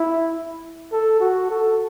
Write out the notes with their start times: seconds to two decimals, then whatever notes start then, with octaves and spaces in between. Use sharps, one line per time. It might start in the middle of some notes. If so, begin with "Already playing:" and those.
Already playing: E4
0.92 A4
1.20 F#4
1.50 A4